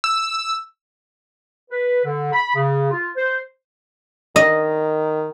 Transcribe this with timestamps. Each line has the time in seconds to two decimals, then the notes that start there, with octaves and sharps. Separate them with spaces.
0.04 E6
1.70 B4
2.05 D3
2.33 B5
2.56 C#3
2.91 F4
3.16 C5
4.36 D#3 D#5